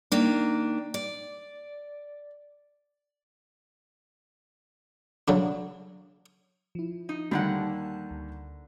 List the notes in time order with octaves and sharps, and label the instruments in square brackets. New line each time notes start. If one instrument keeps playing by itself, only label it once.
[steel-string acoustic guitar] D#3 A#3 D4
D5
[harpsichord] C#3 F#3 D4
[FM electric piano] F3 E4
[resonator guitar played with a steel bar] D#4
[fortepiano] D#2 G3 [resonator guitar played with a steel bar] D3 A#3 F#5 [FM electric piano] A5
[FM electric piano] D2